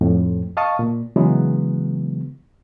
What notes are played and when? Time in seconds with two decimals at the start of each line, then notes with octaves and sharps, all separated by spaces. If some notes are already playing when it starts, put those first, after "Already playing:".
0.01 F2 A2
0.57 D#5 F5 A5 C#6 D#6
0.79 A#2
1.16 C#3 E3 F#3 G#3 B3